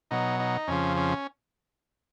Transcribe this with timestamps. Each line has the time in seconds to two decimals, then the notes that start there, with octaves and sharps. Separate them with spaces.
0.11 B2 F#3 D#4
0.40 D#4
0.68 F2 C#3 F3 C#4
0.97 C#4